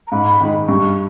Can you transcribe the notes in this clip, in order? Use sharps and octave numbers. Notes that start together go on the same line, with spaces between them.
A#5
G#2 B5
D#3 G#3
G2 C#6